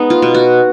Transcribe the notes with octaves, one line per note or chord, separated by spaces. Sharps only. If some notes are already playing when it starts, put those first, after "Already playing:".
Already playing: G#3 B3 D#4
F4
B2
F#4